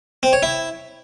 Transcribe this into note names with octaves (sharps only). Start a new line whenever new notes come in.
C4
C#5
E4